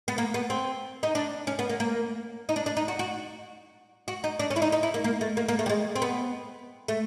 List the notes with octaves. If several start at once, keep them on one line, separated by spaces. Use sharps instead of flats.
B3
A#3
B3
C4
D#4
D4
C#4
B3
A#3
A#3
D#4
D4
D4
D#4
F#4
F#4
F#4
D#4
D4
C#4
E4
D#4
D#4
E4
A#3
A#3
A3
A#3
A#3
A3
G3
G#3
C4
B3
A3